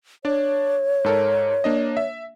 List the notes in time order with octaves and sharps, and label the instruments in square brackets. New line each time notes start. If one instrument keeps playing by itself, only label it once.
[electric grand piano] D4 D5 [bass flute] C#5
[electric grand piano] G#2 A4 A#4
A#3 D4 D#5
E5